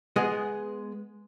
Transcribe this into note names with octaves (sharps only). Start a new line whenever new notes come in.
G#3 B3 G#4 D#5